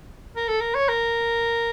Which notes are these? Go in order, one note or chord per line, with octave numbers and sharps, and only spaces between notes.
A#4
A4
A#4
C#5
A#4